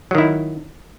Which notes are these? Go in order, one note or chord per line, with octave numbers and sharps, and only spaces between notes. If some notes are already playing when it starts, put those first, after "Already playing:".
D#3 F#3 E4